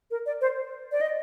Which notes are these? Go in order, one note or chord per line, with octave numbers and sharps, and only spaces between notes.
A#4
D5
C5
D5
D#5